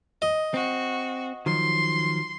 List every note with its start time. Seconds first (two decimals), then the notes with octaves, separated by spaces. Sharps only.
0.22 D#5
0.54 C4 F#4
1.46 D#3 F3 F#3 C6